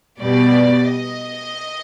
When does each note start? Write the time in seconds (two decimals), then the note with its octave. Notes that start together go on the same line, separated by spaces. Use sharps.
0.21 B2 G3 B3 D5
0.93 D#5